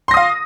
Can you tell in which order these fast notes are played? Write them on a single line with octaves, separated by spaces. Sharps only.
C6 A#6 D#6 F5